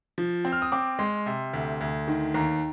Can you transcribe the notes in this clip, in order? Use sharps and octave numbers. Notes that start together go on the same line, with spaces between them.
F3
C4
F6
D#6
C4 D6
G#3 C6
C3
D2
D2
D#3
D#2 A#5